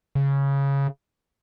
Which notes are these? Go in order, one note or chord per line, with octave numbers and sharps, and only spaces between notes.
C#3